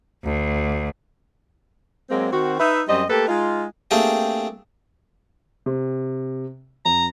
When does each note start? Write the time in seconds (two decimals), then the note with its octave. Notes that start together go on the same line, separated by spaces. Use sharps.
0.24 D2
2.10 F#3 G#3 A#3 C4
2.32 D#3 C4 F#4
2.59 D#4 B4 E5
2.88 F#2 G3 C4 D#5
3.10 A3 A#3 G4 A4 B4
3.28 G#3 D#4 F4
3.91 A3 A#3 C4 D4 G4 G#4
5.66 C3
6.85 F2 A#5